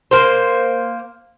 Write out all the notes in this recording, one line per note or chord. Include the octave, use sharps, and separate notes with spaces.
A#3 C5